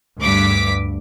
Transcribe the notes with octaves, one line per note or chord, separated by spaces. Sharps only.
D2 G2 D6 B6